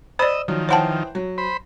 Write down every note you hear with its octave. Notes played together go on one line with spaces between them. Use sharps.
C5 D5 D#5 B5 E6
D#3 F3 F#3
E3 C5 C#5 F#5 G5 A5
F#3
C5 B5